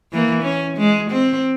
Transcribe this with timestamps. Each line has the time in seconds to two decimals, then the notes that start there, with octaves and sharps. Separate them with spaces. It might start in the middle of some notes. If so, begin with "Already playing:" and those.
0.12 E3 A#3
0.43 C#4
0.78 G#3
1.11 C4